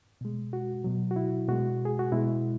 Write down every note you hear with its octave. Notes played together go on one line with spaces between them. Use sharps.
B2 G#3
F#4
B2 F#3
F#4
E4
B2 G#3 F#4
G#4
F#4
B2 G#3 E4